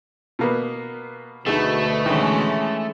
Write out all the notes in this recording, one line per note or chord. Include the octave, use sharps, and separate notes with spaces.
B2 A#3 B3
D2 B2 A3 D#4 G#4
D#3 E3 G#3 C#4